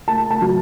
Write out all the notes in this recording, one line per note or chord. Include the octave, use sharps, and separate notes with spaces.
A3 A5
A5
F#3